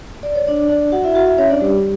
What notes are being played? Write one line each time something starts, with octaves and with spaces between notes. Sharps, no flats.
D5
C#5
D4 D5
D4 D5
F#4 F#5
E4 E5
F#4 F#5
E4 E5
C#4 C#5
D4 D5
G3 G4